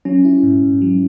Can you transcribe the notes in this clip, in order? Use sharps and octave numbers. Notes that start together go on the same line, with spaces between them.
F#3 C#4
E4
G#2
G#2
F#3